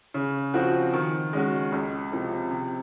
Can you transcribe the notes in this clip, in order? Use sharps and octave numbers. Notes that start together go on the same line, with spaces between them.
C#3
F3 C4 F#4
D#3
G#3 C#4 F#4
C#2
C3 F3 C4
C3